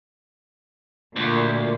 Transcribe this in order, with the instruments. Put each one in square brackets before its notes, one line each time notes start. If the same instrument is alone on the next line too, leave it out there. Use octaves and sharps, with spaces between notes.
[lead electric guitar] D2 [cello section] A#2